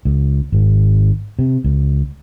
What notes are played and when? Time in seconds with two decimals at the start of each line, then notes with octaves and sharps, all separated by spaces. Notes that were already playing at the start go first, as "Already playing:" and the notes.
0.05 C#2
0.52 G#1 G#2
1.39 C3
1.64 C#2